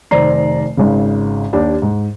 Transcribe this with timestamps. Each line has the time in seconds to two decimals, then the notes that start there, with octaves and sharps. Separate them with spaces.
0.11 F1 D#3 C5 D5 A#5 C7
0.77 G#1 G#2 C#3
1.53 D#2 D4 G4
1.82 G#2